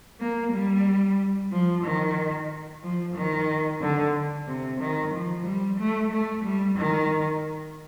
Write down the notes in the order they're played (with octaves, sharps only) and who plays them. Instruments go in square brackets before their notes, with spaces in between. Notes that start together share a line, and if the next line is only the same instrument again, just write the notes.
[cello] A#3
G3
F3
D#3
F3
D#3
D3
C3
D#3
F3
G3
A3
A3
G3
D#3